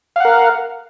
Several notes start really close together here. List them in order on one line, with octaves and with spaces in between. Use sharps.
F5 F#5 A#4